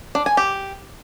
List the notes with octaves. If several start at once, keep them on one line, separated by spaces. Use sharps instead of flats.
D4
G#5
G4